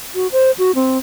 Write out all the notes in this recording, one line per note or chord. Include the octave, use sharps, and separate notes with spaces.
F#4
C5
F#4
C4